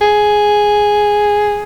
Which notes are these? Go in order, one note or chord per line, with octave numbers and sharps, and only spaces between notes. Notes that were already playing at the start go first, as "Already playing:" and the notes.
G#4